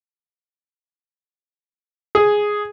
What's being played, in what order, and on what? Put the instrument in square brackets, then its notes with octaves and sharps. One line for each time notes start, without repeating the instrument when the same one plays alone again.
[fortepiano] G#4